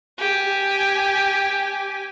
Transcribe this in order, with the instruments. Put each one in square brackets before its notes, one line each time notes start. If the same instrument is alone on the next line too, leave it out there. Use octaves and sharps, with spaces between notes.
[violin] G4 G#5